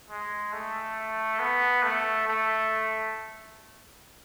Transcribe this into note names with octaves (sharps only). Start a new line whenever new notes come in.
G#3
A3
B3
A3
A3